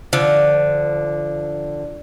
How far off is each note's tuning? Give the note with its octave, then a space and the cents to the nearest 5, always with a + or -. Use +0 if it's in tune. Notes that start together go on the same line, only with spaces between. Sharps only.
D3 +0 F3 -20